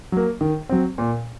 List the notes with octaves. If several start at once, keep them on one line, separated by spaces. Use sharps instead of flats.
F#3 A#3
D#3
F#3 C4
A#2